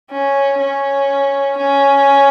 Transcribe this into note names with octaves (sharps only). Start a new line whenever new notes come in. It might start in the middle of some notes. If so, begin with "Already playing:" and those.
C#4
C#4
C#4